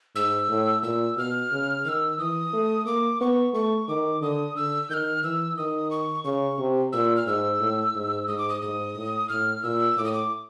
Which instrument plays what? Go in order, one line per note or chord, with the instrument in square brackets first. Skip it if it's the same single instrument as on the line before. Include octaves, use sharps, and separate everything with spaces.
[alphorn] G#2 [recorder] E6
[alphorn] A2
[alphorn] A#2 [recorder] E6
[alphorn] B2 [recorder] F6
[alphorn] C#3
[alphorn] D#3 [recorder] E6 F6
[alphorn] E3 [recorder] D#6
[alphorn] A3
[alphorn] A#3 [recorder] D6
[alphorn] B3 [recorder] C#6
[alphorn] A3 [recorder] C#6
[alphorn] D#3 [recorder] D6
[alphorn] D3 [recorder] D#6
[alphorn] D3 [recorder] E6
[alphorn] D#3 [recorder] F6 G6
[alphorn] E3 [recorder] E6
[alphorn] D#3 [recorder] D#6
[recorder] C#6
[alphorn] C#3 [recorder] C#6
[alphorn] C3
[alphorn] A#2 [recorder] E6
[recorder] F6
[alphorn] G#2 [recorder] E6
[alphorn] A2
G#2
[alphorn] G#2 [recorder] D#6
[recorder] D6
D#6
[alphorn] G#2 [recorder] D#6
[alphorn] A2
[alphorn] A2 [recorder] F6
[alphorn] A#2 [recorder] E6
[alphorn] A2 [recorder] D6
[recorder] D#6
D6